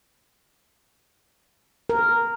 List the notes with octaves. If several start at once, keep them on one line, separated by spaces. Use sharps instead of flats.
A#4